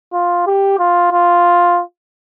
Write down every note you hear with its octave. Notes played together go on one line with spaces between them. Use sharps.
F4
G4
F4
F4